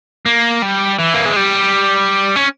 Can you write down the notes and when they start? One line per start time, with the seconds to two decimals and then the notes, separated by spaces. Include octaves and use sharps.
0.26 A#3
0.62 G3
0.99 E3
1.14 A#3
1.25 G#3
1.36 G3
2.36 C#4